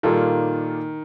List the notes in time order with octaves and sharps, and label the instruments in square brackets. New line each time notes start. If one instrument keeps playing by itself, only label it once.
[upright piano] A#2 G3 A#3 F4 A4 [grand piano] D#3